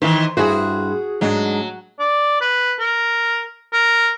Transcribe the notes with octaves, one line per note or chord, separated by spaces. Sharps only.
D#3 E3 C5
G2 E4 F#4 G#4 C5
G#2 F#3 G#3 D4
D5
B4
A#4
A#4